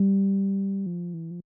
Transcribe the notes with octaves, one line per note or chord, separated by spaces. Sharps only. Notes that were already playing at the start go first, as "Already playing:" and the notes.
Already playing: G3
F3
E3
F3